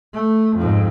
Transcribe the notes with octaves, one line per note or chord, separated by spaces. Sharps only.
A3
F2 G#2